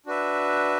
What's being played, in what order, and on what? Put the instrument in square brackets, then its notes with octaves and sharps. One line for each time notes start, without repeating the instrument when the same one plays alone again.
[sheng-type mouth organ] D4 F#4 B4 E5